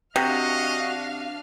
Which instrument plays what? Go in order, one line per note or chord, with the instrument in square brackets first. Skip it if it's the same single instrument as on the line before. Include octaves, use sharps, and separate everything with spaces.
[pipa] C3 [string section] D4 F5 F6 [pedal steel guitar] F#4 [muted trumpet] D#5